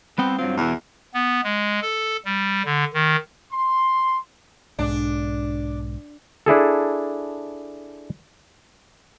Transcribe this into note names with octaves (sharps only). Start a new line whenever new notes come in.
G3 B3 C4 G5
G2 F#3 C4 F4
E2 B2 E3
B3
G#3
A4
G3
D3
D#3
C6
B1 G#2 D4
D4 E4 G#4 A4